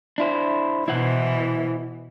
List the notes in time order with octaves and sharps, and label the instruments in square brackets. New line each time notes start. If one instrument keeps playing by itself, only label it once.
[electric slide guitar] D4 E4 C5
[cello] B2 E3 [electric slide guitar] E4 C5 F#5